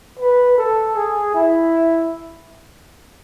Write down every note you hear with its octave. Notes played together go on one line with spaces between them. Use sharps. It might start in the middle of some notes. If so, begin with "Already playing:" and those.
B4
A4
G#4
E4